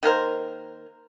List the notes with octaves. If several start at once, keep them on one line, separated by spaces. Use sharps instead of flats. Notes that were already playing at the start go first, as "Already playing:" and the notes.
D#3 A#3 A#4 C5